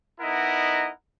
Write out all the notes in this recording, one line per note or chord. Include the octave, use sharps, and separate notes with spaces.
B3 D#4 E4 A#4 D#5 F#5